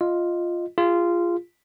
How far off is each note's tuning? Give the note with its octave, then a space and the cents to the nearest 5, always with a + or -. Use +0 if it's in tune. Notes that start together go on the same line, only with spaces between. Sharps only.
F4 +0 D#5 +0
F4 -15 G#4 -30